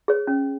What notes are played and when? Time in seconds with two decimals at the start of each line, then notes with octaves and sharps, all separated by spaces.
0.08 G#4 C#5
0.27 C#4